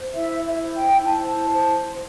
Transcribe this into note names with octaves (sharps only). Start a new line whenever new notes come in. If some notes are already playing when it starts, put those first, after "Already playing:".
Already playing: C5
E4 E5
E5
C5
G5
E4 A5
C5